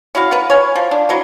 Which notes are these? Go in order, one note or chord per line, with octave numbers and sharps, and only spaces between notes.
C#4 E4 F#4 F5
B3 A#4 B4
C#5 G#5
F3
D4
E3 F#3 A#3